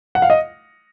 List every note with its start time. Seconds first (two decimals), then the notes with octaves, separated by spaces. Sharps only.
0.15 F#5
0.22 F5
0.30 D#5